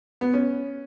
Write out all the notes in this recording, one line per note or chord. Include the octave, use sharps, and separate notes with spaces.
B3
C#4